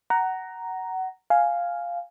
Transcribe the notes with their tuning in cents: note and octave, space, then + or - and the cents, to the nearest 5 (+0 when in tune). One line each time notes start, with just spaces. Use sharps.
F#5 +20 A#5 +0
F5 +0 G#5 +0